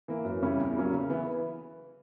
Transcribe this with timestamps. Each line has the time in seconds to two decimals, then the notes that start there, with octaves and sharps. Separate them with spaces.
0.08 E3 A#3
0.25 F#2
0.42 C#3 G3 C#4 E4
0.60 E2
0.77 C#3 F#3 A#3 C#4
0.92 C#3
1.09 E3 B3 E4